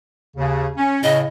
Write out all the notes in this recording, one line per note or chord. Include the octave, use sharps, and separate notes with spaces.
D#2 C#3
C#4
A2 C#3 D#5